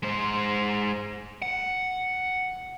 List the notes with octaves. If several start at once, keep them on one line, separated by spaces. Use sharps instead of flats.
G#3 C5
F#5